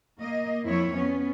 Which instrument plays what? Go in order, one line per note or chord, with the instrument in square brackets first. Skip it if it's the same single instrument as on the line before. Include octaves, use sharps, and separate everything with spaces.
[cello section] A#3 D#5
F2 F3 E4 C#5
B3 C#4